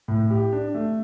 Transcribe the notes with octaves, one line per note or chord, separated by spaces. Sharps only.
A2
G4
D4
A3